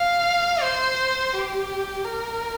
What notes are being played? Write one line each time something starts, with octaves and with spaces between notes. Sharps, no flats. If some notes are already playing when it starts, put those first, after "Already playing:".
Already playing: F5
C5
G4
A#4